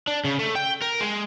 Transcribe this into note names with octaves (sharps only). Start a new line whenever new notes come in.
D4
C#3
A3
G5
A#4
G#3